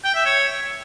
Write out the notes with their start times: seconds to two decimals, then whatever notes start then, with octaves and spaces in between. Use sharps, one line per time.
0.04 G5
0.15 E5
0.26 C#5